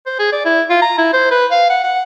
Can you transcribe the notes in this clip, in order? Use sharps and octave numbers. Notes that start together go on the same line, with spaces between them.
C5
G#4
D5
E4
F4
A#5
E4
C5
B4
F5
F#5
F#5